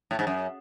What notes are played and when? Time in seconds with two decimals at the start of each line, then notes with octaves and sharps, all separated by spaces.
0.11 A2
0.19 G#2
0.27 F#2